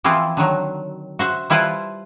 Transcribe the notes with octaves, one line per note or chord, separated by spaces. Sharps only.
E3 F3 C4 E4 F4
D3 D#3 F#3
F#4 C5 E5
G3 E4 F4 B4 C5 A5